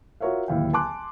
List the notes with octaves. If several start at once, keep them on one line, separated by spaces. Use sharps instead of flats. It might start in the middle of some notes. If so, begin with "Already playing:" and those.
F4 F#4 A#4 C#5 E5 F5
D1 D#2 E4 F5 G5
G#5 A5 C6 D6 F#6